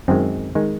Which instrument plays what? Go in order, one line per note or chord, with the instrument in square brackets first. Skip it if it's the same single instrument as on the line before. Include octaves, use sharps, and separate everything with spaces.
[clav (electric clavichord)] F#2 D#3 G#3 C4
D#3 G#3